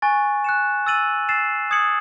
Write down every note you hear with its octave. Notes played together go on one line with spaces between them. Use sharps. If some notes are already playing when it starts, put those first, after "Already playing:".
G#5 C#6 F#6 A6
F#6 C#7 E7
E6 A6 D#7 F#7
E6 A6 C7 E7
D#6 G#6 C#7 F#7